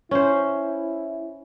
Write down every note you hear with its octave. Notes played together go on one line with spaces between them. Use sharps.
C#4 E4 C5